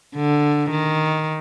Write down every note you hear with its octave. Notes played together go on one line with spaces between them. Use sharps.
D3
D#3